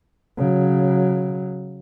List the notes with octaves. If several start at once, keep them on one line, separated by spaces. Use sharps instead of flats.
C#3 F#3